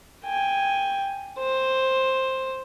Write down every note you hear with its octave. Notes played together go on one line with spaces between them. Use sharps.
G5 G#5
C5